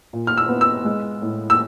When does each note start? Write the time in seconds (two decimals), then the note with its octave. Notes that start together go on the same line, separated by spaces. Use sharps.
0.13 A#2
0.27 F6
0.37 E6
0.49 B3
0.61 E6
0.85 G#3
1.22 A2
1.50 E6